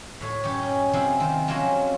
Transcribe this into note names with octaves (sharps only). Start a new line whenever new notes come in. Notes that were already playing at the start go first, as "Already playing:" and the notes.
A2 C#5
F#2 G4 C#5
C#4 D#4
C3 F3 G3 E4 G#4
D#3 C4
F3 F#3 G#3 A#3 C4 C#4